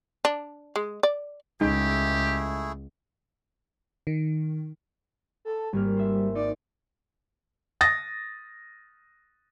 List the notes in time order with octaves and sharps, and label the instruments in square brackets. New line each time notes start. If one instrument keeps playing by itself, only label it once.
[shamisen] D4
G#3
D5
[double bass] C#2 [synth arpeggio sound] G#3 D#4 [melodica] A3 E4 G#4 [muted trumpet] G4
[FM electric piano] D#3
[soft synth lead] A4
[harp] G#1 A#3 F6 [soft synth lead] G3
[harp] C5 E5
[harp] D#4 [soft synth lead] D5
[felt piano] D#6 A6 A#6